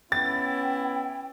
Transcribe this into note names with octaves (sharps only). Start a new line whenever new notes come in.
B3 C#4 E4 G5 A6